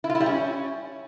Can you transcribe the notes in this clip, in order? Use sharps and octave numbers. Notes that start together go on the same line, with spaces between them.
E4
F4
E4
G3
C#4